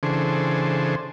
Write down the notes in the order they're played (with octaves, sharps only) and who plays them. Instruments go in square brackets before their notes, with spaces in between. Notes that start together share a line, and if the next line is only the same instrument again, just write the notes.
[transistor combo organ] C#3 E3 D4 G#4 A4 C5